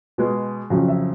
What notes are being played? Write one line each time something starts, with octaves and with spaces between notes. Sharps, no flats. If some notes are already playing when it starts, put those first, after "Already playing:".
B2 G#3
F2 C#3 F#3
E5